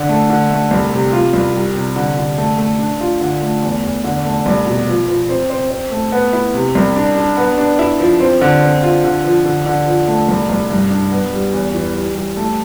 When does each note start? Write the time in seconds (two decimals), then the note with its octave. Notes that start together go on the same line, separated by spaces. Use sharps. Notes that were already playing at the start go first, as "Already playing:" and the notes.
Already playing: D3 D4
0.09 A3
0.30 D3
0.50 A3
0.71 C2
0.92 C3
1.13 F4
1.33 C2
1.54 G3
1.75 C3
1.96 D3
2.17 D3
2.38 A3
2.59 A3
2.79 D4
3.01 F4
3.21 D3
3.42 A3
3.62 E2
3.84 E2
4.04 D3
4.25 A3
4.46 C2
4.67 B2
4.88 F3
5.08 F3
5.29 C4
5.50 C4
5.70 C4
5.91 A3
6.12 B3
6.33 E4
6.54 C3
6.75 C2
6.96 D4
7.16 D4
7.37 B3
7.58 D4
7.79 E4
8.00 F3
8.20 C4
8.41 D3
8.62 C4
8.83 F4
9.04 D3
9.25 F3
9.45 D3
9.66 D3
9.87 F3
10.08 A3
10.29 C2
10.49 C2
10.70 G2
10.91 D4
11.12 B3
11.33 G3
11.53 E2
11.74 E3
11.95 G3
12.15 G3
12.37 A3